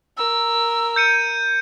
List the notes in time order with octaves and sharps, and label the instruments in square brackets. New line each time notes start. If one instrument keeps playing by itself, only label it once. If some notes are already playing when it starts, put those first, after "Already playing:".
[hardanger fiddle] A#4 [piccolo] E6
[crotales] G6 C#7 D#7